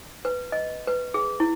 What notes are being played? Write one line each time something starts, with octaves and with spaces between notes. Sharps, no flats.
B4
D#5
B4
G#4
E4